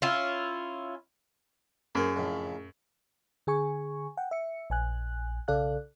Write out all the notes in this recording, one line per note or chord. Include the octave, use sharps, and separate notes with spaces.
C#4 E4 F4
F#2 G#4 A#4 C5
F2 A2 C#3
D3 G#4 G#5 C#6
F#5 G5
E5 C#7
A#1 G#5 F#6
B1 C#3 A4 D5 F5 F#6